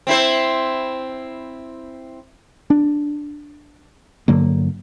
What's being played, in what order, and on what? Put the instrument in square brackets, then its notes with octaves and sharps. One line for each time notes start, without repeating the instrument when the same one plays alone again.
[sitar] C4 E4 C5
[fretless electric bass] D4
G2 D3 F#3 A#3